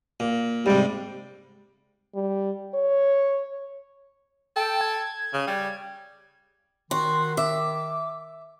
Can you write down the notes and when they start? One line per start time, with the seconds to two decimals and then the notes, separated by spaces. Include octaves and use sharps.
0.20 A#2
0.66 G#2 C3 G3
2.15 G3
2.75 C#5
4.56 A4 G5
4.81 G#6
5.34 C#3
5.47 G3
6.91 D#3 F#4 C6
7.37 E5 D6